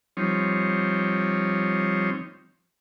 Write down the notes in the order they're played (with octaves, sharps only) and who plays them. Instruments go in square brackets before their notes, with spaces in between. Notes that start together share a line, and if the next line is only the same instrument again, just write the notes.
[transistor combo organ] F3 G3 C4 D#4 C#5